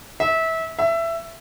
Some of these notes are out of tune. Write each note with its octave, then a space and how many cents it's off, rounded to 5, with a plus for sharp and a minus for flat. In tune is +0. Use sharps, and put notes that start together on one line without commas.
E5 -25
E5 +15